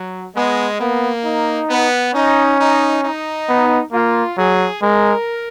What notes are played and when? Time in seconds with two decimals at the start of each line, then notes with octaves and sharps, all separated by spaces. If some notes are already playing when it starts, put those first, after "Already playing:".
Already playing: F#3
0.35 G#3 B3
0.80 A#3 B3
1.25 D#4
1.70 B3
2.14 C#4 D#4
2.59 D#4
3.03 D#4
3.49 B3
3.92 A#3 F4
4.37 F#3 G#4
4.82 G#3 A#4